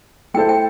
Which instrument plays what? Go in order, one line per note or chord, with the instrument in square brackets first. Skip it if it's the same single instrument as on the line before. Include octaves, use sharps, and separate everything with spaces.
[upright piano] A3 E4 A4 C5 [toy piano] G5
[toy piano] G5